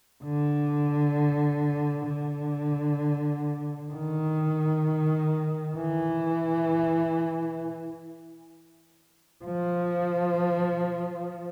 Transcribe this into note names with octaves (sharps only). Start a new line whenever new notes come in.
D3
D3
D#3
E3
F3